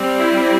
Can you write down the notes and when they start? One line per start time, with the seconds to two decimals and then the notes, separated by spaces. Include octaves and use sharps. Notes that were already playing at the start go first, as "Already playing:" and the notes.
Already playing: G3 C4
0.17 E4